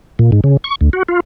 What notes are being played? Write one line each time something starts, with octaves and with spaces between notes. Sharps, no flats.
A#2
G#2
C#3
C#6
D2
F#4
F4